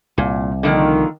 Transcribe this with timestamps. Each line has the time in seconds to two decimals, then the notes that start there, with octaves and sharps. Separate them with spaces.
0.18 C2 A#2
0.63 D3 D#3 F3 A#3